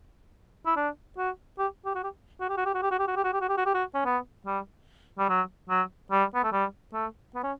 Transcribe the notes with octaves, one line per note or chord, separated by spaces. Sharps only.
E4
D4
F#4
G4
G4
F#4
G4
F#4
G4
F#4
G4
F#4
G4
F#4
G4
F#4
G4
F#4
G4
F#4
G4
F#4
G4
F#4
C#4
B3
G3
G3
F#3
F#3
G3
B3
A3
G3
A3
B3
C#4